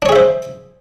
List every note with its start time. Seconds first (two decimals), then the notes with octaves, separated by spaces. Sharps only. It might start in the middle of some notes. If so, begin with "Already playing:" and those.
0.02 D4
0.06 C#5
0.09 G#4
0.12 E5
0.16 C5